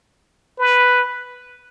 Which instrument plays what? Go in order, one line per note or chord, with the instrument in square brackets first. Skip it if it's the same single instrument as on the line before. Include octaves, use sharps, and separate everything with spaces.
[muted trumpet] B4